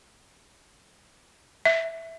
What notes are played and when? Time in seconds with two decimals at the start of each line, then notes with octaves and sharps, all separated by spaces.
1.65 E5